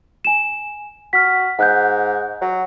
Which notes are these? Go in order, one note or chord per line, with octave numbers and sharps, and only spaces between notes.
G#5 E7
F#4 F6 B6
G#2 F#5 F#6 G6
F#3